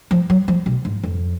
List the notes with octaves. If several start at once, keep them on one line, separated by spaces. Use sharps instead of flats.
F3
F#3
F3
B2
G#2
F2